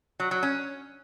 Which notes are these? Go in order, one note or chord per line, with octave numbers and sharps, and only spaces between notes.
F#3
F#3
C#4